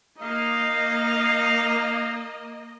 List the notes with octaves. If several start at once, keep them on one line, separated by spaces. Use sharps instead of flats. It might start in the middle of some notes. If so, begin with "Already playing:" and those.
A#3 D#4 D#5 F5